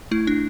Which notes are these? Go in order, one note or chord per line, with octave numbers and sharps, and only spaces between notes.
A3 E4
D4